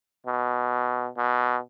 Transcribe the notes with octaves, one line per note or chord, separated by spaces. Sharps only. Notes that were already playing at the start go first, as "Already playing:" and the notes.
B2
B2